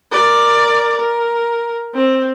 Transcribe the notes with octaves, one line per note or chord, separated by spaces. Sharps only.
A#4 D5
A#4
C4